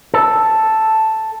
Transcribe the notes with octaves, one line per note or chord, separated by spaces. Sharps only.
A4